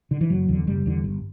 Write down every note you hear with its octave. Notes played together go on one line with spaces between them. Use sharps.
D3
E3
F#1 F#3
E2 D3
F#1 G3
E2 D3
G1